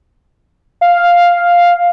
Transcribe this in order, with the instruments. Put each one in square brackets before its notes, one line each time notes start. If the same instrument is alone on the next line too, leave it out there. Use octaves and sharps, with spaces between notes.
[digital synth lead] F5